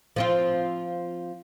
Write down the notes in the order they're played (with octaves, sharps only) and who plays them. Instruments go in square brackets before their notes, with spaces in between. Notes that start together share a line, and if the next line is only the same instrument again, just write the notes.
[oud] F3 C4 F4